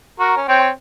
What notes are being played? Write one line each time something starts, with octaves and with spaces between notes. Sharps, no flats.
F#4 A#4
C#4
C4 C#5 G5